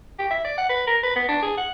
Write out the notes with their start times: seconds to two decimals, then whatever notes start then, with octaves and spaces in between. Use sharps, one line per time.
0.19 G4
0.31 E5
0.45 D5
0.58 F#5
0.69 B4
0.87 A#4
1.03 B4
1.16 B3
1.29 D4
1.43 G#4
1.57 F#5